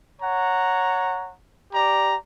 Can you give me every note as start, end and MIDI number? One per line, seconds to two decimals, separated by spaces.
0.22 1.32 73
0.22 1.32 78
0.22 1.32 82
1.73 2.15 67
1.73 2.15 74
1.73 2.15 82